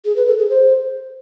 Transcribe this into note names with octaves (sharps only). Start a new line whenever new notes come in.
G#4
B4
A4
G#4
C5